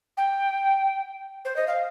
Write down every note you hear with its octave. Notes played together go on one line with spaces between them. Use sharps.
G5
C5
D#5
F5